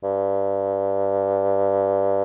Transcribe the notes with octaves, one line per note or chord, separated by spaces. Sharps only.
G2